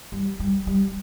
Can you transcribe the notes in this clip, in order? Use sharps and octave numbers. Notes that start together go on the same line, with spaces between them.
G3
G3
G3